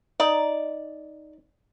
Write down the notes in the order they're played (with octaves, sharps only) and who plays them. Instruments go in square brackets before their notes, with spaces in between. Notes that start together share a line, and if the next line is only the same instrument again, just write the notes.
[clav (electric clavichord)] D#4 [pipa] D5